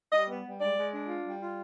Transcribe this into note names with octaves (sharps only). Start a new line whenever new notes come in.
G3 D#5
B3
G3
G#3 D5
G#3
D4
F4
G3
F4